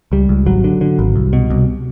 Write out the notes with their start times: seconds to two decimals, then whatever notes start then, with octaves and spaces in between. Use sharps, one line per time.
0.12 C#2 G3
0.29 C#2
0.46 G#1 F#3
0.64 D3
0.81 D3
0.99 G#1
1.16 C2
1.33 B2
1.50 C2